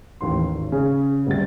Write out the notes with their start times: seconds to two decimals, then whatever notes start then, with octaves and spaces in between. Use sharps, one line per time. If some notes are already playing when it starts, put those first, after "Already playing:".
0.21 A1 D#2 C6
0.54 G#1
0.72 C#3 C#4
1.27 D2 G2 C3 A6